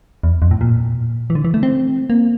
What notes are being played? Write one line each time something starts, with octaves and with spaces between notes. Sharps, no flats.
E2
F2
A2
A#2
E3
D3
E3
A3
C4
A#3